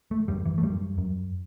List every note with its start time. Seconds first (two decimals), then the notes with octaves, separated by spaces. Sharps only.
0.11 A3
0.28 F#2 G3
0.45 E3
0.58 A3
0.63 F#2 G3
0.98 F#2